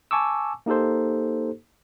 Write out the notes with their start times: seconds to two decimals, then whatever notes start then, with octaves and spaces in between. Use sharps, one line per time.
0.11 G#5 A5 C#6 D6 E6
0.66 A#3 D#4 G4 A4 C5